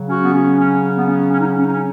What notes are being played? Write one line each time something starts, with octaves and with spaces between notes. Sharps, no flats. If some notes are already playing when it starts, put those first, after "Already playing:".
Already playing: C#3 F#3
C#4 F#4
B3
C#4
C#4
B3
C#4
C#4
D#4
C#4
C#4
D#4
C#4